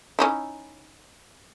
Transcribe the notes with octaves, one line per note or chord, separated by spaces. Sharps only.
C#4 D#4 E4